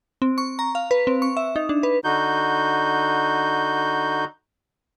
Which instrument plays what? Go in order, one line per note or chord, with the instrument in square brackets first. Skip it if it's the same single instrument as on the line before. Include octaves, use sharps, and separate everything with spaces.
[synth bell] C4
C#6
A#5
F5
B4
C4
C#6
E5
D#4
D4
B4
[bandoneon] D3 D#4 F#4 G6